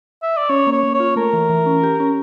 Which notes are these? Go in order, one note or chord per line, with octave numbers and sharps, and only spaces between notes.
E5
D5
C#4 C#5
A#3
C#5
A#3
C#5
F4
A3 A#4
E3
E3
C#4
G4
C#4